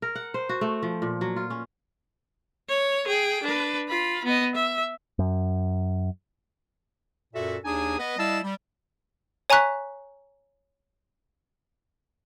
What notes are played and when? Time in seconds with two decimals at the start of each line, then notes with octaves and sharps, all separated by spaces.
0.02 A#4
0.15 F#5
0.34 C5
0.49 F#4
0.61 A3
0.83 F3
1.02 A#2
1.21 F#3
1.36 F4
1.50 C#4
2.69 C#5
3.07 G#4 G5
3.43 D4 B4
3.89 F4 B5
4.25 B3 D#5
4.55 E5
5.19 F#2
7.34 F#2 A#2 F#4 A4 E5
7.64 D#2 D4 D#4 G#4 G#5 D#6
7.98 B3 B4 D#5
8.17 G3 E4 D#5 F5 A5 E6
8.43 G3
9.50 C#5 G#5 A#5 C#6 F#6 B6